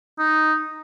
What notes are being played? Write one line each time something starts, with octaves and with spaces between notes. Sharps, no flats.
D#4